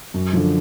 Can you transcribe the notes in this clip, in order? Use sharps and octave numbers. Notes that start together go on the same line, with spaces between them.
F#2
D3 F3